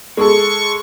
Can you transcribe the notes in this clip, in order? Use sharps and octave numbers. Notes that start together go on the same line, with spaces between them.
G#3 G#4 A4 C#6